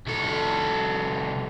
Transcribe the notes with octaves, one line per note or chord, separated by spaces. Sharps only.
C2 A4